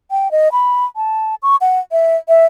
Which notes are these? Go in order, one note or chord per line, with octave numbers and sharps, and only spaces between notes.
G5
D#5
B5
A5
C#6
F#5
E5
E5